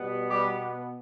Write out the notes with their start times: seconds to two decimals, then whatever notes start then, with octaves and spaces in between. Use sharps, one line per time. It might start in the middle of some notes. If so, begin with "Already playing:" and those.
Already playing: B2 G3 B3
0.31 G3 G4